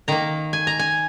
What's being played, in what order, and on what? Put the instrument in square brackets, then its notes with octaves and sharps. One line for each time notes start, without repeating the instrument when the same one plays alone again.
[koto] D#3 A#3 A#5
G#5
A#5
G#5